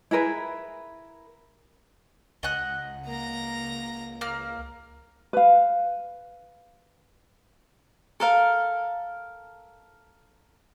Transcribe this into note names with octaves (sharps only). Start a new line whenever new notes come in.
E4 G#4 A#4 B4
C#2 D#5 F#5 F#6
A#3 A#5 A#6
A#3 F6
B4 F5
A4 A#4 F5